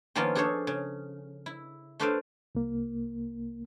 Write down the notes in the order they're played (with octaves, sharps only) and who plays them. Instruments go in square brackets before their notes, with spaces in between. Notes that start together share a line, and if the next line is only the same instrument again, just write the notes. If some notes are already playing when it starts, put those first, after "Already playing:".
[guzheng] D#3 F3 A#3 B3 C#4 F4
D4 G#4 A4 C5 C#5
C#3
E4
A3 D4 B4 C5 D5 F5
[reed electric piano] C2 A#3